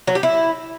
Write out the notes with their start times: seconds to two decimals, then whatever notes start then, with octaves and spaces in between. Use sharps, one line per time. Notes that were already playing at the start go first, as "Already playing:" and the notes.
0.07 F#3
0.15 G4
0.23 E4